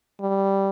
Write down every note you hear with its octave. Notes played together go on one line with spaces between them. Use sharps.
G3